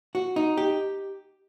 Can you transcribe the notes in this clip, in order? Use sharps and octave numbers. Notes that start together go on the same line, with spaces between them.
F#4
D#4
G4